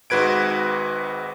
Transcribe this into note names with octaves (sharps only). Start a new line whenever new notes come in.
G#1 G#2 F#4 B4 G#6 D7